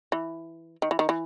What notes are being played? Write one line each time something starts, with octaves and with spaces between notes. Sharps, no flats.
E3
D#3
E3
D#3
E3